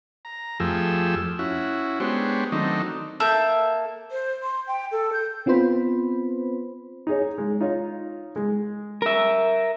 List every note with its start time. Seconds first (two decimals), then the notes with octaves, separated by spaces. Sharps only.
0.25 A#5
0.60 F2 F3 A3 G4 G#4 E6
1.39 C#4 E4 F#4
2.00 G#3 B3 D4 G4 C5 C#5
2.52 D#3 F#3 A3 C4 D4 D#4
3.20 A#3 A4 E5 G6
4.11 C5
4.42 C6
4.67 G5
4.92 A4
5.13 G6
5.46 B3 C4 F4 B4 C5 B5
7.07 D#4 G#4 C#5
7.38 G#3
7.61 D#4 F4 C#5
8.36 G#3
9.02 A#4 E5